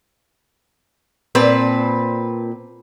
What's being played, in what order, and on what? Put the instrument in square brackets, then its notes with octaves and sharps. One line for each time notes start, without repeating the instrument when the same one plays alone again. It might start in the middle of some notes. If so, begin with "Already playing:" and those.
[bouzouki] A#2 C4 B4 A5